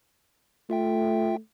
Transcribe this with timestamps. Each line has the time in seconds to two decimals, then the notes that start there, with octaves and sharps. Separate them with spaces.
0.70 A3 F4 E5 G5